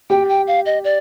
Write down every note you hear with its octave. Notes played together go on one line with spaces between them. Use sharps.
G4 G5
G5
F5
D#5
D5